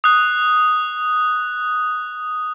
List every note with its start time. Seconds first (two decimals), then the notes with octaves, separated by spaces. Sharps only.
0.04 D#6 F#6